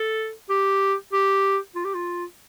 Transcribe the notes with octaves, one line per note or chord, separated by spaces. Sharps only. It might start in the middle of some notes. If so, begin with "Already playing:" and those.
Already playing: A4
G4
G4
F4
G4
F4